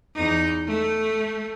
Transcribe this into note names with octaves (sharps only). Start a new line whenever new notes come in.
E2 D#4
A3